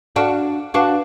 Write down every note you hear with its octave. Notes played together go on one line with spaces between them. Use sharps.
D4 F#4 A4 F5 A5 F6
D4 F#4 B4 F5 A5 D6